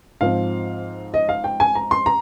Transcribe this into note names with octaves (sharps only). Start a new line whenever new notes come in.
G#2 F3 C4 F5
D#5
F5
G5
G#5
A#5
C6
A#5